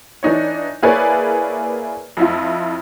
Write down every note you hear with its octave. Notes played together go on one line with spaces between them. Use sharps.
E3 D4 D#4 C#5
A#3 E4 G#4 B4 C#5 D5
F2 E4 F4